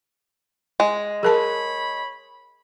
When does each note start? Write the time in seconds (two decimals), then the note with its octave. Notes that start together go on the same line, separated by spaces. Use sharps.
0.80 G#3
1.23 G#4 A#4 C#5 A5 B5